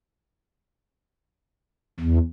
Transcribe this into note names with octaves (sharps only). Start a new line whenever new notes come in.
E2